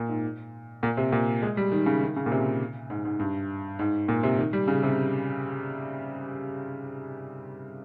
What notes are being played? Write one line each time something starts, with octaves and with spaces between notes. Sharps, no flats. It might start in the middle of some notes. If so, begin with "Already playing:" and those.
Already playing: A#2
G#2
A#2
C3
A#2
G#3
G3
D#3
C#3
D#3
C#3
A#2
C3
G#2
G#2
G2
G#2
A#2
C3
D#3
G3
C#3
C3